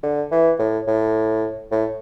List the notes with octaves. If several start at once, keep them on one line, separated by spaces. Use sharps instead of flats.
D3
E3
A2
A2
A2